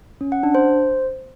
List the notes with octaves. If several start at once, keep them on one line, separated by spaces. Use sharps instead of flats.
C#4
F#5
D4
C5